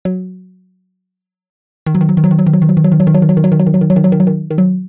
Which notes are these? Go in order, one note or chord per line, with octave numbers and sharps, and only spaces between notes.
F#3
D#3
F#3
D#3
F#3
D#3
F#3
D#3
F#3
D#3
F#3
D#3
F#3
D#3
F#3
D#3
F#3
D#3
F#3
D#3
F#3
D#3
F#3
D#3
F#3
D#3
F#3
D#3
F#3
D#3
F#3
D#3
F#3
D#3
D#3
F#3